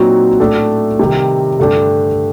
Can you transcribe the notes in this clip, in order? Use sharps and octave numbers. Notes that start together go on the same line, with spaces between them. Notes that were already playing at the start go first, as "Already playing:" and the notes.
Already playing: A#2 F#3 C4 D#4 F#4
A2 A3 D4 A4
C3 D#3 G3
G2 D3 A3 D4 G4